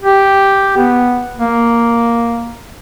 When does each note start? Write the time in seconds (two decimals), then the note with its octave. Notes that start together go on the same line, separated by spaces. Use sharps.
0.02 G4
0.77 B3
1.38 A#3